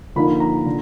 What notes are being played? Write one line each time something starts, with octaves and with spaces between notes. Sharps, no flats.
D3 F3 A#3 D#4 B5
A#5
D3